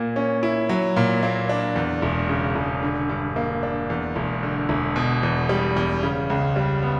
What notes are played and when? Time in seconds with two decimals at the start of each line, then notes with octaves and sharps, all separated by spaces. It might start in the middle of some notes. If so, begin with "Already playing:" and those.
Already playing: A#2 A#3
0.16 C#4
0.43 E4
0.69 F#3
0.96 A#2
1.23 A#3
1.49 D4
1.76 E2
2.02 E1
2.29 C#3
2.55 E1
2.83 D3
3.09 G2
3.36 A#3
3.63 D4
3.90 E2
4.16 E1
4.43 D3
4.69 E1
4.96 B2
5.23 E2
5.49 G3
5.76 E2
6.03 C#3
6.30 C#2
6.56 G3
6.83 B3